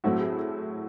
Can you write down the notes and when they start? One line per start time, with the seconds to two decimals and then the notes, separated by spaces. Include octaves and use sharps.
0.04 A2 F#3 A3 C4 E4 F#4
0.20 G#4